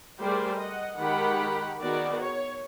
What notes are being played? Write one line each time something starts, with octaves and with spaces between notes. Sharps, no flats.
G3 A3 G#4 A#4 C5 D5
D#5 F#5
D#3 G#3 G4 F#5 B5
D#3 B3 F#4 G#4 D5
C#5